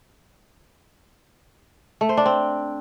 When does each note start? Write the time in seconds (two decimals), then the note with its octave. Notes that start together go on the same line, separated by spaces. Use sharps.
2.01 A3
2.09 C5
2.17 D4
2.26 C4